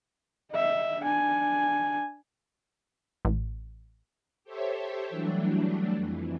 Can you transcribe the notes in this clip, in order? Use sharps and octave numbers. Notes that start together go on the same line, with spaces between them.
D#5 E5
D4 G#5
A1
G4 A4 C5 C#5 E5
E3 F#3 G3 A3 D4
F2 E3